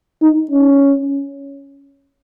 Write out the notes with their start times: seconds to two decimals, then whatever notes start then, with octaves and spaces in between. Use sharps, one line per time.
0.22 D#4
0.51 C#4